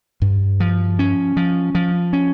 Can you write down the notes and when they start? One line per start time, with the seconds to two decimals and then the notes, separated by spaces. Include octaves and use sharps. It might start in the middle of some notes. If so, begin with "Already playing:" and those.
0.22 G2
0.60 F3
0.99 C#4
1.37 F3
1.75 F3
2.13 C#4